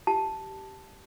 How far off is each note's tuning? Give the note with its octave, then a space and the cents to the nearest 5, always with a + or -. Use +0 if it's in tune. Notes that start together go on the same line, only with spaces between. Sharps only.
G4 -15 A5 +0